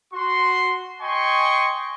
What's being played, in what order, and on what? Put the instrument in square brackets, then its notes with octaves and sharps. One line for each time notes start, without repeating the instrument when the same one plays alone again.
[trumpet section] F#4 C6
D#5 G5 G#5 C6 C#6